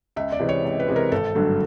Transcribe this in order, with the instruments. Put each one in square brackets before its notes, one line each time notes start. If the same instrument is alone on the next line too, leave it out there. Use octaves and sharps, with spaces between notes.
[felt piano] C#2 E5
D5
C3 E3 G#3
C#5
C#2
B4
C3 E3 G#3
A#4
G#1 A4
G2 D3 F#3 A3